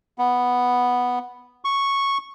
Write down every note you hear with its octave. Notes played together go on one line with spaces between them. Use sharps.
B3
C#6